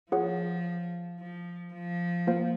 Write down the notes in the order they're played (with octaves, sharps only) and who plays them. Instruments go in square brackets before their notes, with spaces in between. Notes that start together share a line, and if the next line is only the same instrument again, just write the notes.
[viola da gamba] F3 [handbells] F4 G#4 C#5 F#5
[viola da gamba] F3
F3
[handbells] A#3 F4 C5 F5